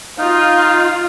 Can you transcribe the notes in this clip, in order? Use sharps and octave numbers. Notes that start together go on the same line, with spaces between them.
D#4 F4 F5